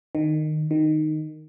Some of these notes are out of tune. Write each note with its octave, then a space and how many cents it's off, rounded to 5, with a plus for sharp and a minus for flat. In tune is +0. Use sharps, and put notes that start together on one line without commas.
D#3 -20
D#3 -10